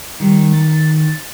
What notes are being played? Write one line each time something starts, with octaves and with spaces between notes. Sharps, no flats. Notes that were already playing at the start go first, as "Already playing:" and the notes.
D#3 G3
A6